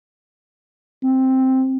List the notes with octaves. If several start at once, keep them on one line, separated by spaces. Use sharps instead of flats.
C4